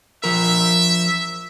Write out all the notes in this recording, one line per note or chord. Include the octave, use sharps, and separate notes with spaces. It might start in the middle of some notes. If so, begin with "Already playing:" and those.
F3 A#4 E5